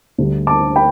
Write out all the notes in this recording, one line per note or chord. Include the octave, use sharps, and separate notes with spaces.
D2 D3 G3
A5 D6
G5 B5